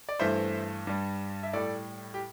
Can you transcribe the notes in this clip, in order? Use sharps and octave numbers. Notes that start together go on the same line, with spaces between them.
D5
G2 E3 A3 C5 E5
G2 G3
E5
A2 G3 A4 D5
G4